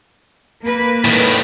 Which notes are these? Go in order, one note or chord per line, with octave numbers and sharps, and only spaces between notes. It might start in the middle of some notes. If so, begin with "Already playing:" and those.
A#3 B4
A2 D#3